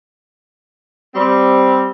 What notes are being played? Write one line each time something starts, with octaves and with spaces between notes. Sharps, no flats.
G3 C4